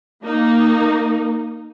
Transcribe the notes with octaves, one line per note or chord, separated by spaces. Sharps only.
A#3 D#4